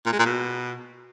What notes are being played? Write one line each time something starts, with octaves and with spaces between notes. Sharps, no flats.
A#2
G#3
A#2
B2